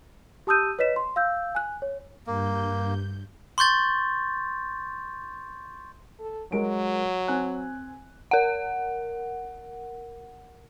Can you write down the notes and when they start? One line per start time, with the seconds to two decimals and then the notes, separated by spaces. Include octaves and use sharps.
0.47 G4 A5 D#6 E6 G6 D#7
0.79 B4 C#5 D#5 B6 E7
0.96 C6
1.16 F5 E6 G6
1.55 G#5 F#6
1.82 C#5
2.27 G2 A#3 G6
3.58 C6 C#6 G6 A6
6.19 A4
6.52 F#3 G#3 A#4 D7
7.28 C4 G#5 F#6
8.31 A#4 F#5